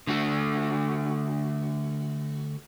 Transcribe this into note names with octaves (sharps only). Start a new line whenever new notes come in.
D3 A3 F#4